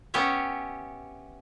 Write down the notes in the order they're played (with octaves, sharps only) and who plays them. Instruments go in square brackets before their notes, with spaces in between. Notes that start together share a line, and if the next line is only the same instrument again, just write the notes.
[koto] B3 C#4 G4 C#5 E5